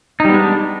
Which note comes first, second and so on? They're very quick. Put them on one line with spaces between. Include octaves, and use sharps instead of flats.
D#4 G3 B3 G#3 D4